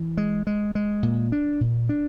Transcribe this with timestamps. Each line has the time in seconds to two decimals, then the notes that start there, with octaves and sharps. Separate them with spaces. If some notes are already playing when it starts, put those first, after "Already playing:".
Already playing: E3
0.17 G#3
0.47 G#3
0.75 G#3
1.03 A#2
1.32 D4
1.61 A#2
1.89 D4